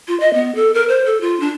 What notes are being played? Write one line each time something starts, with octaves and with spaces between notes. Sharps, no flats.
F4
D#5
B3
A4
A#4
C5
A4
F4
D4